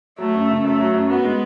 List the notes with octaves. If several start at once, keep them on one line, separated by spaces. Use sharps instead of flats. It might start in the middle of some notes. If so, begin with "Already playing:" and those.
F#3 A3
F#2
C#3
F#2 A3
F#3
F#2
B3 F#4
G#3